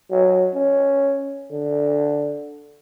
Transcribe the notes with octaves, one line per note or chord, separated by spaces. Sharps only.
F#3
C#4
D3